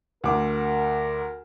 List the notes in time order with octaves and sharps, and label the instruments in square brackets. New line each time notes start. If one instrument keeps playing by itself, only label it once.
[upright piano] D2 D6 [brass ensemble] A#4